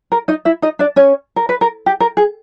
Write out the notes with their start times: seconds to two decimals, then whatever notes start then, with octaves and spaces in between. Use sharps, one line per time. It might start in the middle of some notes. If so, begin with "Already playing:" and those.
0.12 A#4
0.28 D#4 D#5
0.45 E4 E5
0.62 D#4 D#5
0.79 D4 D5
0.96 C#4 C#5
1.36 A#4
1.49 B4
1.61 A#4
1.86 G4
2.00 A#4
2.17 G#4